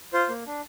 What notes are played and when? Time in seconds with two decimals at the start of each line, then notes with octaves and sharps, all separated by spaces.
0.13 F4 C5
0.29 A#3
0.46 D4